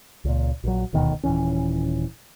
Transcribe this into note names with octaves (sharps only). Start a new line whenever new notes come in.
C#2 A#2
A#1 F#3
D#1 D2 B2 D#3
D#1 G#1 E3 C#4